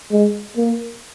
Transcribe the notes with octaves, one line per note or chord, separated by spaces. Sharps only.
G#3
A#3